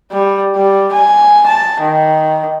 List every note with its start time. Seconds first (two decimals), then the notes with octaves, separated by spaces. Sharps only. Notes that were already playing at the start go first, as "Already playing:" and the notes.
0.12 G3
0.56 G3
0.93 G#5
1.47 A5
1.81 D#3